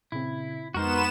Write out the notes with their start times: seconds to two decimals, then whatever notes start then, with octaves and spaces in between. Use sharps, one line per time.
0.12 A#2 C#3 C4 E4
0.74 F2 G#3 B3 D#4 F#4 A#4 C5 E7